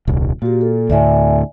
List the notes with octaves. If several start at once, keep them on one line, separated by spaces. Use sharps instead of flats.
D#1 C2
A#2 F#4 G4
A4
D2 A2 D5 E5 G#5